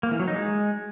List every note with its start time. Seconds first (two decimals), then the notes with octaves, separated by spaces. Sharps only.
0.03 A#3
0.11 E3
0.19 F#3
0.28 D#4
0.36 G#3